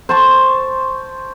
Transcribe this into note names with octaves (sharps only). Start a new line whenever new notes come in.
C5 A5 C#6